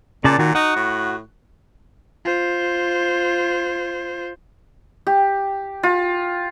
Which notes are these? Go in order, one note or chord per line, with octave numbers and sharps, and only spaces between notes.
A#2 C#3 D5 A5
A#2 D#3 F#4
D#4 F#4 F#5
A2
F4 C5
G4
F4